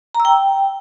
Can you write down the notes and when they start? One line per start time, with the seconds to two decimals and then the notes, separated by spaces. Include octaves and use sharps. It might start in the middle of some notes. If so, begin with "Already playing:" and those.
0.15 A#5
0.20 E6
0.25 G5